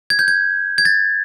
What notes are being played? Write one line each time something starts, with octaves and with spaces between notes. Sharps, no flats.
G#6
G6
G#6
G#6
A6